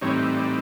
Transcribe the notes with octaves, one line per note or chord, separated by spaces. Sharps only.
A2 E3 G3 C4 D#4 C#5
D5